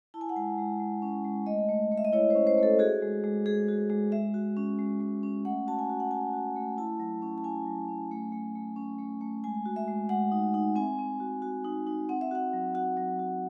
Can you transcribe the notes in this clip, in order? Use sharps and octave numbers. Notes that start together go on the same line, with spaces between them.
E4 A5
G#5
F#5
G#3 G#5
G#3
G#3
C#4
G#3
A3 D#5
A3
A3
E5
D#5
E4 C#5
C5
C#4
C5
A3
A4
F#4 G#4
G#3
G#3
G#3 G#4
F#4
G#3
G#3 E5
F#4
C#4
G#3
G#3
C#4
A3 F#5
F#4 A5
G#5
F#4
F#5
F#4 G#5
F#4
A3
E4 A5
F#3
C#4
A5
C#4 G#5
F#3
C#4
A3
A3
A3
C#4
A3
A3
G#3 G#5
F#4
E5
G#3
G#3 F#5
D#4
D#4
C4 G#5
C4
F#4
F#4
D#4
D#4
C4 F#5
E5
F#4 F#5
F#3
F#4 F#5
F#3
F#4